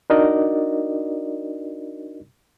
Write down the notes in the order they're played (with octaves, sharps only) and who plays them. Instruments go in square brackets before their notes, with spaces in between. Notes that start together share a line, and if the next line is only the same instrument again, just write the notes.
[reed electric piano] D4 D#4 F#4 A#4 D5 D#5